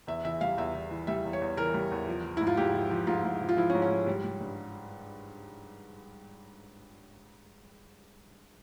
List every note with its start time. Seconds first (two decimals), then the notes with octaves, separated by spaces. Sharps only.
0.07 E2 E5
0.25 E3 E5
0.41 G3 F5
0.58 E2 E5
0.75 E2
0.90 E3
1.07 G3 E5
1.25 E2
1.33 C#5
1.42 E2
1.57 E3 A#4
1.74 G3
1.91 E2
2.07 F3
2.24 F3
2.37 G#2 E4
2.47 F4
2.57 G#2 G4
2.74 F3
2.91 F3
3.07 G#2 F4
3.24 G#2
3.41 F3
3.49 F4
3.57 F3 E4
3.70 C#4
3.75 G#2
3.82 C#4
3.91 G#2
4.07 G3
4.24 G3
4.41 G2